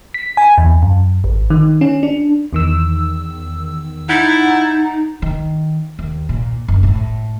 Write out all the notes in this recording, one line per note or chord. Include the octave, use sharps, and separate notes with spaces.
B6
G#5
E2
F#2
G#1
D#3
C#4
D4
E2 D#3 E6
D#4 E4 F#5 G6 A6
D#3
D#2
A#2
F#1
A2